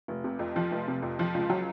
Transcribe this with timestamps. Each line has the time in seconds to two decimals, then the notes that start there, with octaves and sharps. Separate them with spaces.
0.08 F1
0.24 C3
0.39 F2
0.56 F3
0.71 F1
0.88 C3
1.02 F2
1.19 F3
1.34 C#2
1.50 F#3